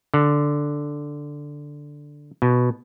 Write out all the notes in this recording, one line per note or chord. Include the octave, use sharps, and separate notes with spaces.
D3
B2